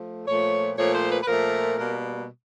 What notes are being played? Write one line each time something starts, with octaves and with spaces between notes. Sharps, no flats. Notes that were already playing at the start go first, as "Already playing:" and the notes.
Already playing: F3 A3
A#2 F3 A3 C#5
A#2 F3 A3 C#5
C5
B4
B4
A#2 F3 A3 A#4
B2 G3 A#3 A#4